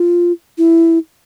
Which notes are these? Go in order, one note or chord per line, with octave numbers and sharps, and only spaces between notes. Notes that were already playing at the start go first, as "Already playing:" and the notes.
Already playing: F4
E4